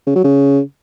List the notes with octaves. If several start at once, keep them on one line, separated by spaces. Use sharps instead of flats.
C#3
F#3
C#3